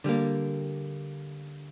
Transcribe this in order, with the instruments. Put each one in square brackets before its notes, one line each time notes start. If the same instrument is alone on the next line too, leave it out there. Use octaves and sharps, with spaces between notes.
[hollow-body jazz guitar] D3 G3 A#3